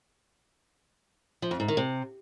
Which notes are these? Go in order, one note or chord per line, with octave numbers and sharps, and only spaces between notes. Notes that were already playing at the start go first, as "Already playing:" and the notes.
F3
F2
G#2
D#3
C3